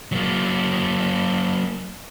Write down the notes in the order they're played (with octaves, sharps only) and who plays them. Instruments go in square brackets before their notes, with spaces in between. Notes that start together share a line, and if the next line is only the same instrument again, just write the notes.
[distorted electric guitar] F#3 A#3